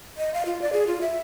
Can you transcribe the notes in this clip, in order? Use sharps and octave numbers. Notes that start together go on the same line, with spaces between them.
D#5
F5
F4
D5
G#4
F4
E5